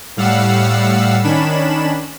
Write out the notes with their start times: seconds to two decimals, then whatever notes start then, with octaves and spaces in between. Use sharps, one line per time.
0.17 A2 G3 F5 F#5 E6
1.23 D#3 C#4 D4 B5 E7